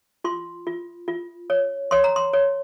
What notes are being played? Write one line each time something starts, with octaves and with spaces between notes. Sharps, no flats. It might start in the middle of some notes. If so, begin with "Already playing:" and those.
F4 C6
F4
F4
C#5
C#5 C6
A#5
C6
C#5